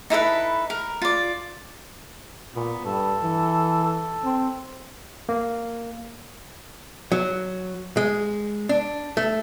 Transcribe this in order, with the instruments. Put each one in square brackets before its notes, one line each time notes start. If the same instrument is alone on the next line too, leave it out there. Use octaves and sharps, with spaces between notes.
[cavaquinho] D#4 E4 A4 B4
A#4
F4 D5
[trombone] A#2 [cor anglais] B3
[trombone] G2 [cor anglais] A4
[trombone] E3
[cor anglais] A4
[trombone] C4
[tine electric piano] A#3
[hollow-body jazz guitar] F#3
G#3
D4
A3